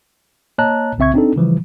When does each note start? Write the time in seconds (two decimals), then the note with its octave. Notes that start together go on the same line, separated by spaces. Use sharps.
0.58 A#3 C#5 D#5 A5 A#5 F#6
0.98 C2 C#3 C4 E5 C#6 G#6
1.14 C4 D4 D#4 A4
1.36 C#3 E3 F3 G3